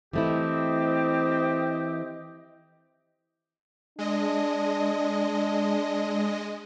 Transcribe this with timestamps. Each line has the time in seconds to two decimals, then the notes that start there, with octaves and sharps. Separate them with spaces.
0.13 E3 A3 C4 E4 G4 D#5
3.99 G#3 D4 D#5